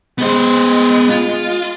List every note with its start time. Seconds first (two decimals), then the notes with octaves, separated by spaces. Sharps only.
0.18 G#3 B3 C5
1.10 F4